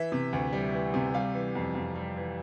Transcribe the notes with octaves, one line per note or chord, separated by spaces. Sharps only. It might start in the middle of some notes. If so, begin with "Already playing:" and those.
Already playing: E3 E5
C3
D2
G3
E3
C3
G3 F5
E3
F2
F2
G3
E3